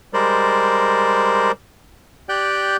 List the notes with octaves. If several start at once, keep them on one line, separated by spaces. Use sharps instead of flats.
G3 G#3 A#4 C5 D5
G4 D5 G5 F#6 G6